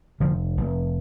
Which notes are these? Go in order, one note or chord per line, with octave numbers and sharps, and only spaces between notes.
F1 D3 F3
F1